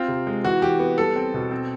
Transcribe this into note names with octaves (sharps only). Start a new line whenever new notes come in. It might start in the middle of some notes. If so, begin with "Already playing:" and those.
Already playing: C4 F4
C3
G#3
E3 F#4
E3 G4
B3
G3 A4
C4
B2
C4